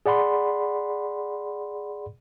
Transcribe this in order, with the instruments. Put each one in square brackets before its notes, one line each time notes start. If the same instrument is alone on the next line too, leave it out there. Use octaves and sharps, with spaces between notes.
[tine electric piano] G#4 D5 F#5 B5 C6